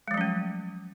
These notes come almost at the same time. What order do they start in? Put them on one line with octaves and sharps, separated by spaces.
G#3 F3 F#3 C#4 A3